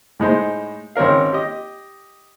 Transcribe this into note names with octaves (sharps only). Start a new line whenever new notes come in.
A2 G#3 D#4 C5
G#1 C4 C#4 A#4 F5
G4 D#5